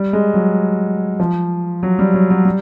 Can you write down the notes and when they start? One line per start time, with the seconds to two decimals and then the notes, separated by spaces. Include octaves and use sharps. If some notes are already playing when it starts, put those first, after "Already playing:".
Already playing: G3
0.13 G#3
0.34 F#3
1.20 F3
1.83 F#3
1.99 G3
2.14 F#3
2.31 F#3
2.45 G3